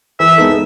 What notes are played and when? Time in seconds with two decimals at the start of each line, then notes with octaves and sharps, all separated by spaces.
0.19 E3 E5
0.38 G#3 B3 D#4 A4